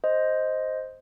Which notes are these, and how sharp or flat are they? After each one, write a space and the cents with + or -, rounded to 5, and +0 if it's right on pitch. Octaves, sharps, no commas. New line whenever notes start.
C5 +0 D#5 +0